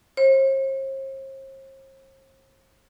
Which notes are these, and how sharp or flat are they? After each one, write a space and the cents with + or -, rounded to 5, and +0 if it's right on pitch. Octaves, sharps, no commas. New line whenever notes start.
C5 +45